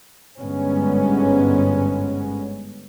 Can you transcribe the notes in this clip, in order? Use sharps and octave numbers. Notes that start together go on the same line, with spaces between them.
G1 G#2 G#3 B3 C#4